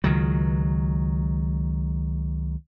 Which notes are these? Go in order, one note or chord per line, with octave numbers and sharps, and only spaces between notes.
C#2 D#3 F#3